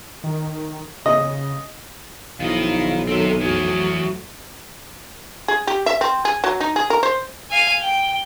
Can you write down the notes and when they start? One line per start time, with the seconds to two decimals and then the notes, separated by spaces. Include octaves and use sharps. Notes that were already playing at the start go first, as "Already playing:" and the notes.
0.24 D#3
1.06 C#3 D#5
2.40 B1 D#3 F3 E4 D#5 F5
3.08 D#3 F#3 C4 A4 E5
3.40 F2 E3 F#3 A3 G#4
5.48 G#4
5.67 G4
5.86 E5
6.01 C4
6.25 G#4
6.44 F#3
6.60 D#4
6.76 G#4
6.90 A#4
7.03 C5
7.50 F5 G#5
7.81 G5